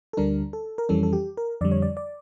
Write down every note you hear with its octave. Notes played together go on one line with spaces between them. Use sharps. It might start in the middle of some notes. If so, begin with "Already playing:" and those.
A4
D2 D3 G3 D4 A#4
A4
A#4
F2 E3 G3 C#4 A4
A4
G4
A#4
F2 D3 G3 D5
C#5
D5
D5